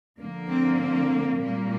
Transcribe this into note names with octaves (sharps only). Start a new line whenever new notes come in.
D3 F3 A#3
C4
C4
A#2 G3 A#3